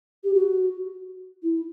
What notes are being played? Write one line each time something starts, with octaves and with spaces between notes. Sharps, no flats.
G4
F#4
E4